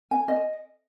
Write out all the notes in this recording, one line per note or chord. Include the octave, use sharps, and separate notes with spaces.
G#5
D#5